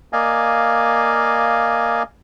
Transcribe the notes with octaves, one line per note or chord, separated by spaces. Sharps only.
A#3 D5 D#5 F5 G#5